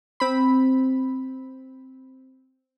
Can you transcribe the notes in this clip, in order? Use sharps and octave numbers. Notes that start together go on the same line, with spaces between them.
C4 B5